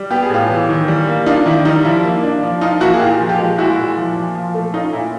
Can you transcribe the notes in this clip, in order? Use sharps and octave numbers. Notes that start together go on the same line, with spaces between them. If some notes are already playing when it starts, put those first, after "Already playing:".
Already playing: G3
B3 G4
G#4
A2 F4 G4
E3
D#3
G3
A#3
D4 D#4 F4
D#3 E4
G3 D#4
F3 E4
A#3
D4
F3
F3 D#4 F4
A#3 E4 F#4
G#4
A#2 F4 G4
F3
F4 G4
G#3
A#2 E4 F#4
A#2
F3
A#2
F3
A3
C#4 D#4 F4
A#2 E4